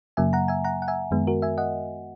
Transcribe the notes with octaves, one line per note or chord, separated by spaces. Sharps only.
F#2 C#3 F#3 A#3 E5 G#5
F#5 A#5
E5 G#5
F#5 A#5
F#5
E5 G#5
F#2 D#3 G#3 B3
F#4 A#4
E5 G#5
D#5 F#5